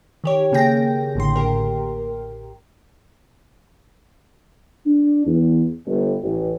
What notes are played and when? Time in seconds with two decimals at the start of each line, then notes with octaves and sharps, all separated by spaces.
0.24 D#3 G4 C#5
0.52 C#3 A#3 G#4 G5 A#6
1.15 A1 A2 D3 C6
1.36 G4 A#4
4.86 D4
5.26 E2
5.86 G1
6.23 A1